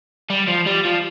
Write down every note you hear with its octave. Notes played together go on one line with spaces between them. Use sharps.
G3
F3
G3
F3